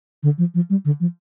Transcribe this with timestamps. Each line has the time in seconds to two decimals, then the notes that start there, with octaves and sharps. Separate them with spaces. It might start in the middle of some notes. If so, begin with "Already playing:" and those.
0.23 D3
0.38 F3
0.54 F3
0.70 G3
0.85 D3
1.00 F3